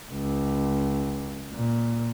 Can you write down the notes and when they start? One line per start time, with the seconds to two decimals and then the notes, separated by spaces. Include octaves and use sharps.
0.11 C#2
1.53 A#2